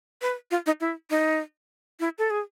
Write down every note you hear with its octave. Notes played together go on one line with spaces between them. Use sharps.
B4
F4
D#4
E4
D#4
E4
A4
G#4